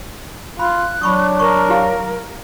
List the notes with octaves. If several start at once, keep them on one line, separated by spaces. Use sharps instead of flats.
F4 B5 F#6
F#3 D4 B5 C#6 D#6
A#4 C#6
E4 G4 F5